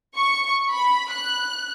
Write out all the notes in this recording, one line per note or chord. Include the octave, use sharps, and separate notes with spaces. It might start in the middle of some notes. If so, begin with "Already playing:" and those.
C#6
B5
F#6